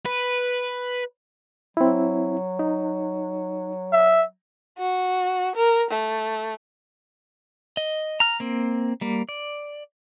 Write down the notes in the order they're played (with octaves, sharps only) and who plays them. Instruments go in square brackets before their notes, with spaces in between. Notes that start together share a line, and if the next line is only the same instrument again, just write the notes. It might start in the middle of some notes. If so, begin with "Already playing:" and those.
[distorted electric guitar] B4
[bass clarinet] F#3 [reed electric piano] C4 E4
[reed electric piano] D#4
[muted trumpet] E5
[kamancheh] F#4
A#4
A3
[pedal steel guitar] D#5
A#5 F6
A#3 C4
G3 A#3
D5